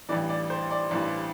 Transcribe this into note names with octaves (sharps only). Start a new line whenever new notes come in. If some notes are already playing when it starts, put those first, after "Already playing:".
A1 G2 E3 D5
D5
C5
D5
A1 G2 E3